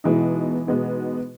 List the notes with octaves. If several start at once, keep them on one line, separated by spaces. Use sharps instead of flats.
B2 E3 G#3 B3 D#4
B2 G#3 B3 D#4